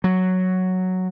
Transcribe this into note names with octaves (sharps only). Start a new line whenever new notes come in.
F#3